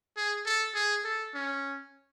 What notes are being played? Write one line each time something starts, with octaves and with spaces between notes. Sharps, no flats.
G#4
A4
G#4
A4
C#4